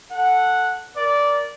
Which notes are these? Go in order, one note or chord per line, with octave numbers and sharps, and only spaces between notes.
A4 F#5
A#4 D5